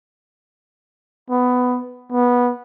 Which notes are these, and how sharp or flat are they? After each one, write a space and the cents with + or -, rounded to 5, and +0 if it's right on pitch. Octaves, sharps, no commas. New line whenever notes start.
B3 +10
B3 -15